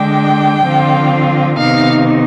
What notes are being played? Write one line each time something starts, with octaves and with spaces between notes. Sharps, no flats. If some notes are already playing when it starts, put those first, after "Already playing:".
Already playing: D3 G#3 D4 G5
D3 F3 C4 F4
C3 D#3 B3 D#4 F5